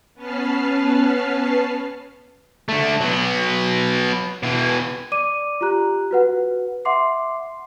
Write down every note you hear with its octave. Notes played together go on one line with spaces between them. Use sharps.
B3 C#4 B4 A5 F6 C7
D3 A3
F#3 B3
B2 E3
D5 D6 D#7
F4 G4 A#5 F#6
F#4 B4 F#5
E5 F#5 C6 D6 C7